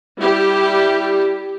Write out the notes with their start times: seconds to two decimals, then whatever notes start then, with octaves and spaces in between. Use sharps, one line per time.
0.19 G3 E4 G4